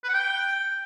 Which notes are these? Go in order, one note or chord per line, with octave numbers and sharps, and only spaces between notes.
B4
F#5
G5